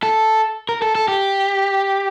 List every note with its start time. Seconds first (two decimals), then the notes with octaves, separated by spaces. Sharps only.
0.03 A4
0.69 A#4
0.82 A4
0.95 A4
1.08 G4